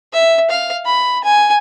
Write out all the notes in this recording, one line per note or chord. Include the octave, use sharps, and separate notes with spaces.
E5
F5
B5
G#5